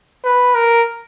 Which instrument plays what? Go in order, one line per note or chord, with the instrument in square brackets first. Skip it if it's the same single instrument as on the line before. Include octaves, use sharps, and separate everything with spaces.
[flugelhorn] B4
A#4